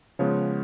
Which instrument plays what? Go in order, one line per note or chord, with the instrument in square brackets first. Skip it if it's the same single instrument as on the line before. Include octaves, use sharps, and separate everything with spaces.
[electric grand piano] C#3 F3 G#3 B3 C#5